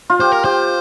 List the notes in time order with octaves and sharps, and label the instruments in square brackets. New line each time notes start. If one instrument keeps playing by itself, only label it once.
[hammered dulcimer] F4
[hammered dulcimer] G4 [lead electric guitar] C5
[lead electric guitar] A#4
[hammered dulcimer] G4 [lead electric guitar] C5